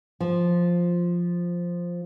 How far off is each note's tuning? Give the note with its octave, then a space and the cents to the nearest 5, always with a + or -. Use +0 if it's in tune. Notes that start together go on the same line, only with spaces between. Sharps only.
F3 +0